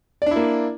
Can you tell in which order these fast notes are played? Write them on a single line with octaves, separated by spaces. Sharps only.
D5 D4 E4 A#3